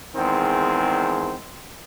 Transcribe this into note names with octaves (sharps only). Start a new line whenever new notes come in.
E2 D#3 G#3 C4